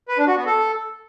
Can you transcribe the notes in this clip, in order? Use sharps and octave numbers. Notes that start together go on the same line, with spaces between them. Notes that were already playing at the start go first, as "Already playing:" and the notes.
B4
D4
F#4
B3
A4